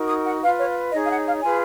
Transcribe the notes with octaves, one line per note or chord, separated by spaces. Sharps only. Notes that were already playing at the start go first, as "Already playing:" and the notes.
Already playing: D#4 F#4 A#4
D#6
F#5
F4 B4 F5
C#5
D#4 G#4 C#5 D#5
F5
F#5
F5
F4 G#4 B4 G#5